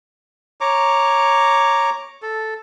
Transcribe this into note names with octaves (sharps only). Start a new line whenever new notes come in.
C#5 A#5 D6
A4